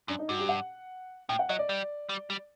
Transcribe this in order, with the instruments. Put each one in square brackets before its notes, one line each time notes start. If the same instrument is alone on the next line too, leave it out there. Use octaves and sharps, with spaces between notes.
[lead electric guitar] F#2 [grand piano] D4
[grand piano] D#4
[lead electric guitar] G2 [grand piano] F#4
[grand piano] G4
F#5
[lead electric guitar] A2 [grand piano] G5
[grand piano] F#5
[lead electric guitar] F#3 [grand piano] D#5
[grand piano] D5
[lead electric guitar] G3
G3
G3